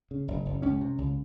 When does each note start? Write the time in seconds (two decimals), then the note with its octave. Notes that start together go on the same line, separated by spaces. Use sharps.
0.11 C#3
0.28 F#1
0.46 F#1
0.62 C#2 C#4
0.81 C3
0.98 C#2